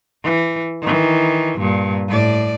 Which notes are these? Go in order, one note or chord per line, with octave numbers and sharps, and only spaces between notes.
E3
D#3 E3
G2 A#2
A2 D5